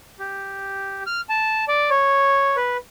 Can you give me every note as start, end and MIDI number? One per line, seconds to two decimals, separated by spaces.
0.19 1.03 67
1.07 1.21 89
1.29 1.65 81
1.68 1.90 74
1.90 2.56 73
2.56 2.77 71